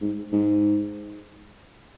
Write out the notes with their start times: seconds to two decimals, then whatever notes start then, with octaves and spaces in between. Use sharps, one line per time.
0.02 G#2
0.32 G#2